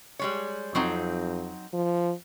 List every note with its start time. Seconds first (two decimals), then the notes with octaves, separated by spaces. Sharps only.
0.19 G3 G#3 C#5
0.75 F2 F#3 C4 D#4
1.73 F3